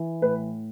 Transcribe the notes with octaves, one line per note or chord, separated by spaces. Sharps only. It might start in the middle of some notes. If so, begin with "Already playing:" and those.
Already playing: E3
A2 B4